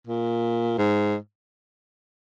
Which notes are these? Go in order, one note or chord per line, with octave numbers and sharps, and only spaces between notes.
A#2
G#2